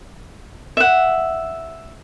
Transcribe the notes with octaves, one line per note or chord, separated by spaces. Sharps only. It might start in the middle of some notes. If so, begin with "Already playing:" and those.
E5 F#5